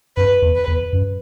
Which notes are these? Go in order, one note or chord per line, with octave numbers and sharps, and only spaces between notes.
F#2 B4
E2
B4
E2
F#2